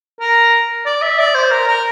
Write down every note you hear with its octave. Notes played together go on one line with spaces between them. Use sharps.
A#4
D5
E5
D5
C5
A#4
A#4